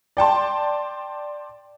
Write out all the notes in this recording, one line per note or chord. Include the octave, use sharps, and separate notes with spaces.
D5 G5 A5 C6